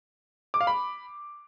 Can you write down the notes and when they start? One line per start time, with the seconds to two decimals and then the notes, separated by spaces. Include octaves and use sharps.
0.54 D6
0.61 F5
0.67 B5